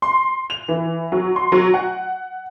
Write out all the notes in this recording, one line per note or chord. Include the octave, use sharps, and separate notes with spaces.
C6
F7
E3
F#3
C6
F#3
F#5